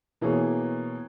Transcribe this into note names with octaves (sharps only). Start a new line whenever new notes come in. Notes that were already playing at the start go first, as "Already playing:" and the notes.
B2 E3 A#3 G#4 C#5